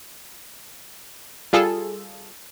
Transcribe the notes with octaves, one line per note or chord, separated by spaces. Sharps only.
G3 F4 G#4 A4